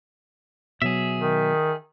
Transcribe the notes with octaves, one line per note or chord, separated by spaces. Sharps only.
B2 F#3 G#4 E5
D#3